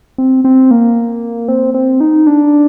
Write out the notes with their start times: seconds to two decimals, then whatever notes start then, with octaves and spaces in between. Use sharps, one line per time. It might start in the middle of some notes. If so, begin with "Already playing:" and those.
0.18 C4
0.45 C4
0.71 A#3
1.48 C4
1.74 C4
2.01 D#4
2.27 D4